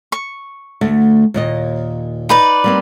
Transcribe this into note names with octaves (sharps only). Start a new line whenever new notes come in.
C#6
D2 A3
D#2 A#2 D#5
D#4 B4 D5
G3 A#3 C4